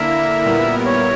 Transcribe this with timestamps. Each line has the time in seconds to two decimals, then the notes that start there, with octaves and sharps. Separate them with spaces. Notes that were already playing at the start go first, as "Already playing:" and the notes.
Already playing: D3 A#3 E4 A#4 E5
0.45 A#2 G3 B3 E4 A#4
0.85 C#5